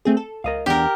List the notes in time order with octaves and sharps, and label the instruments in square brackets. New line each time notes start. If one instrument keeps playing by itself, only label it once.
[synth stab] A3 C4 G#4
A4
[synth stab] C#2 [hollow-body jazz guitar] A#4 D#5 F5
[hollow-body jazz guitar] E2 B3 D4 [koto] G4 A#4